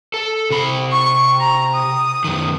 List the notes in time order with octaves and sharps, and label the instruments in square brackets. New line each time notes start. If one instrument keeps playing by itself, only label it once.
[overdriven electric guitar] A4
C3 B5
[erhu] C#6
A#5
D#6
[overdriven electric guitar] F#2 D#3